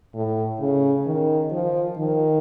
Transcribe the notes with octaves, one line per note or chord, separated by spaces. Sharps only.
A2
C#3
D#3
F3
D#3